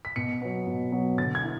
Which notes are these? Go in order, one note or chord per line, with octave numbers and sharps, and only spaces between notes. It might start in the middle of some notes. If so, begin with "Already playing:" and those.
B6
B2 C#7
F#3 B3
B2
F#3 B3
D3 A6
G#6
E4